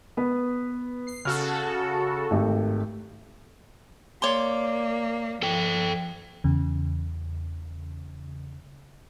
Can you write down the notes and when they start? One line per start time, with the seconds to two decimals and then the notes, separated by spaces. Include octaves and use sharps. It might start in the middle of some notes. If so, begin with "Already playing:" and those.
0.17 B3 B4
1.07 C7
1.25 C#3 F#4 A4 F6
2.31 G#1 A3 G4
4.22 A#3 C#5 D5 C6
5.42 F3 A4 G5
6.44 E2 C#3